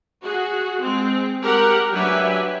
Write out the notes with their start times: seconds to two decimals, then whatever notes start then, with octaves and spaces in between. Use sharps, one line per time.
0.23 F#4 G#4
0.80 G#3 C4
1.41 G#3 G4 A#4 F#5
1.92 F#3 D4 G4 B4 E5 G#5